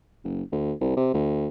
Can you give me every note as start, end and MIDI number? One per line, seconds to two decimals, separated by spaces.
0.24 0.43 30
0.52 0.73 38
0.81 0.93 36
0.97 1.11 48
1.14 1.48 38